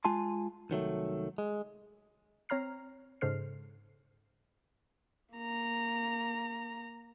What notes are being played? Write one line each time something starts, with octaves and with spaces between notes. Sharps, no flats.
G#3 F4 G#5 A5 C6
C2 D#3 F#3 A3
G#3
C4 C#5 A#5 F6 C7
G#2 C#3 A4 C5 F6 C7
A#3 A#5